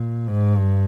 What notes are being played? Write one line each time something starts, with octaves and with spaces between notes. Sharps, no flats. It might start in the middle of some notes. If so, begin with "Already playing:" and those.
Already playing: A#2
G#2
G2